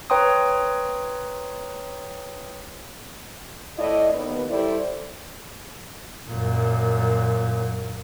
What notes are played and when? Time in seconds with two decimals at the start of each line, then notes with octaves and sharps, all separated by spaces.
0.10 B4 C#5 G5 A#5 C6 D#6
3.78 A2 E4 D5 D#5
4.12 D#2 B3
4.49 G3 E4 A4 C5 D5
6.29 F#2 A#2